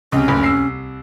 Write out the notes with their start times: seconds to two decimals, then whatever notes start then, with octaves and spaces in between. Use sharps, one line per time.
0.12 C#2 C3 C#4
0.28 F#1 D2 B5
0.43 C2 E6 C7